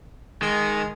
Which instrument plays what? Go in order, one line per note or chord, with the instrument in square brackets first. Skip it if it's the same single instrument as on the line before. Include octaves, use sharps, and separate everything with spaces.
[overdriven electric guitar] D#3 [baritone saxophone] G#3